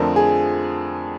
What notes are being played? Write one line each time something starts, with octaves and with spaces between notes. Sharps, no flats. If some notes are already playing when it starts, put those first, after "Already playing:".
Already playing: F2 D3 F3 A3 C4 A#4
G#4